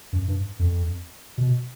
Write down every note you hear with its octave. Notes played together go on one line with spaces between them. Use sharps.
F#2
G2
F2
B2